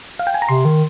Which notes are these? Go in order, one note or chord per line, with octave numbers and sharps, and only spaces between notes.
F5
G5
G#5
A#5
C3 C6
D#3